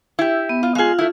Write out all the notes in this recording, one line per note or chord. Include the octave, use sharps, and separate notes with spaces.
E4 G4
B3
F4
G#3 F4 G#4 F5
A3 E4